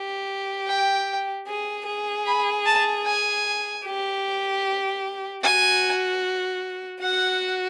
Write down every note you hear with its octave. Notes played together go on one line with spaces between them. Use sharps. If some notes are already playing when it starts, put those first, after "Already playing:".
Already playing: G4
G5
G#4
G#4
B5
A5
G#5
G4
F#4 G#5
F#4 F#5